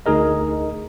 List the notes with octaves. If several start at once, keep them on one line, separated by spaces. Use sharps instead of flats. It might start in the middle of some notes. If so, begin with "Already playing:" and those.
D2 D#4 G#4 A#4 D#5